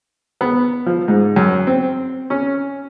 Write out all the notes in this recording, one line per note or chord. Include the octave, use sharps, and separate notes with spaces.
B3
F3
G#2
F#2
C4
C#4